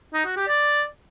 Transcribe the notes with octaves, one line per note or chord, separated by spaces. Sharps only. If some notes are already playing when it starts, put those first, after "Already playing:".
D#4
F#4
G4
D5